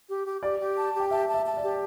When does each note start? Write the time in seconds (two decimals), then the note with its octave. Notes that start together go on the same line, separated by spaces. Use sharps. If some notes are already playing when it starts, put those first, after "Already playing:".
0.09 G4
0.26 G4
0.43 G4 D5
0.60 G4
0.76 A5
0.94 G4
1.00 G5
1.11 E5 A5
1.28 A5
1.34 E5
1.45 A5
1.57 D5
1.63 G4